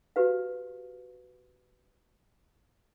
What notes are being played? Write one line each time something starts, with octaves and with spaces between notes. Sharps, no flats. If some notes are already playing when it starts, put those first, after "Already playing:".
F#4 G4 B4 F5